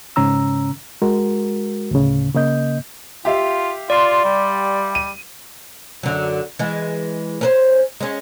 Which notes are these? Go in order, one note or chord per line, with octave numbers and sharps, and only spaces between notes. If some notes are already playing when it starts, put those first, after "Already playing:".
G#2 C#3 C#4 A#5 E6
G#3 F#4 A#4
D2 A2 C#3
C#3 A#3 D#5 G6
F4 G4 E5 F5
F4 D5 C6
G3
D#7
F#2 D3 F#3
E3 G#3
C#4 B4 C5
G#3 C#4